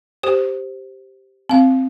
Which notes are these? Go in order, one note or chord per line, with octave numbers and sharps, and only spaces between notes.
G4 C5
C4 F5